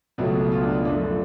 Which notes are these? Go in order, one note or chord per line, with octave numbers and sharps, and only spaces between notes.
C#2 B2 F#3 A3
F4
D4
F#2 F3 A3 D4
D4